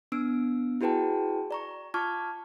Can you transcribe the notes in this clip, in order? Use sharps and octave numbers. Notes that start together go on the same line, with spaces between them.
B3 D4 E6 D7
E4 F#4 G#4 B4 G5 A5
D5 A#5 C#6
F4 A5 C#6 D6 F6 G#6